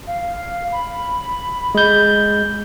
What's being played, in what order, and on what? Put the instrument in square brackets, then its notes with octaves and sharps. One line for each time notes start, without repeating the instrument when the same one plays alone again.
[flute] F5
B5
[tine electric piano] G#3 G6